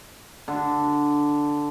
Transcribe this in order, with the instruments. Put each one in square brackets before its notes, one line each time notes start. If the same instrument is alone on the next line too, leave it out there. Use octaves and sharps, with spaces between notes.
[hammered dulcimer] D3